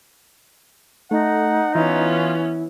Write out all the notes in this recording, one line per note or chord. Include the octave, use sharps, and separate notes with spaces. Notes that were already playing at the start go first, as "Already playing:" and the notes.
A3 D#4 F#5
E3 B3 C#4 E4 F4